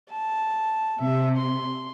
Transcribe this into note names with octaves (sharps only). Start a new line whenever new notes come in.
A5
C3 E5
C6